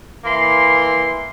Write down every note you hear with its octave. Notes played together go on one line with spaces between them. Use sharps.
E3 A#3 C6